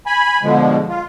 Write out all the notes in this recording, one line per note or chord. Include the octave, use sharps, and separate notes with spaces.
G#5 B5
B2 D3 F3 G#3
F4